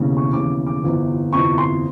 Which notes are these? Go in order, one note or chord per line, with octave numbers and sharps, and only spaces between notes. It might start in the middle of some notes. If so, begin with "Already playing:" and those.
Already playing: E1 D#2 C#3 E3
C#6
E1 D#2 C#3 E3 D6
D6
G1 F2 C3 E3
G1 F2 C3 E3 C#6
C6